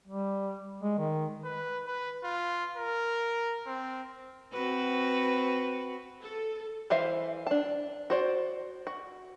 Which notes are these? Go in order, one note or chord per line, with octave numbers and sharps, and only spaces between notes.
G3
G#3
D#3
B4
B4
F4
A#4
C4
C4 F#4 B4
A4
E3 C5 E5 F5
D4 A5
F#4 C5 D5
F#4